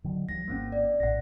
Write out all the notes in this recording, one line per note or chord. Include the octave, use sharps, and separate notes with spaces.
D3 D#3 F#3
D2 F3 G3 A#6
G#1 A#3 C4 C#4
D5
A#1 A2 F#5 A#6